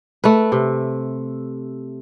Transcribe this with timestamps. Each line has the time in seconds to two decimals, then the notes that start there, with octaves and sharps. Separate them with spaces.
0.24 A3 B4
0.52 C3